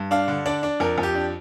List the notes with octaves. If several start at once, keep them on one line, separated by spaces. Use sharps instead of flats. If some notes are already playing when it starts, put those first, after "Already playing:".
Already playing: G2
D4 F5
D3
D4 D5
D4
F2 A#4
F2
G4
D4